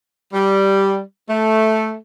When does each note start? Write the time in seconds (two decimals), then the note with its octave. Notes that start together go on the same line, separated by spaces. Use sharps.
0.33 G3
1.28 A3